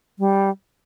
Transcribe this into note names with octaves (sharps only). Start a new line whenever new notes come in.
G3